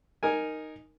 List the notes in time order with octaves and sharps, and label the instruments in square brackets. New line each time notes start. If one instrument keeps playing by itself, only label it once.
[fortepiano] D#4 A#4 G#5